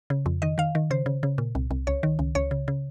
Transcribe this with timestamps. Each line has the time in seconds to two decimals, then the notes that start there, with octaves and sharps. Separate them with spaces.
0.10 C#3
0.26 F2
0.42 D#3 D#5
0.58 D#3 F5
0.75 D#3
0.90 C#3 C5
1.06 C#3
1.23 C#3
1.38 A#2
1.55 C2
1.71 C2
1.87 C#2 C#5
2.03 D#3
2.19 C#2
2.35 C#2 C#5
2.51 C#3
2.68 C#3